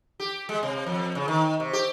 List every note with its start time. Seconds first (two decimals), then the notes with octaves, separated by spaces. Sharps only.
0.20 G4
0.49 G#3
0.63 C3
0.86 F2
1.15 C#3
1.28 D#3
1.60 C3
1.73 G4